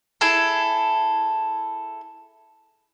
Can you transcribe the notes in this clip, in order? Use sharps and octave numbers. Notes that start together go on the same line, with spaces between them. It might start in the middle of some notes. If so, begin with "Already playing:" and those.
E4 G#4 A4